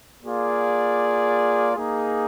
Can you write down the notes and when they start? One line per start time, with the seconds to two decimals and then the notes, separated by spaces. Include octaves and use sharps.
0.21 A#3 F4 G#4 D5
1.76 A#3 D#4 G#4